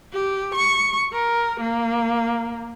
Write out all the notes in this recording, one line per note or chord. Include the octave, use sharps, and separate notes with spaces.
G4
C#6
A#4
A#3